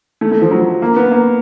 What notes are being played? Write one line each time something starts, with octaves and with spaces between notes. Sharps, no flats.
A3
A3
F3
F#3
A#3
B3
A#3